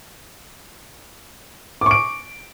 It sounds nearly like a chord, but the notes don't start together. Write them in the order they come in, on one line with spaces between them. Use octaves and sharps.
D6 C#6 D7